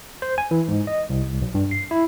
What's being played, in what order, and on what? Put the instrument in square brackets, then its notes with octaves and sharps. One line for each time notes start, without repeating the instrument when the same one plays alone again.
[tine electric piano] C5
G#5
E3
G#2
D#5
C2
B1
G2
C7
E4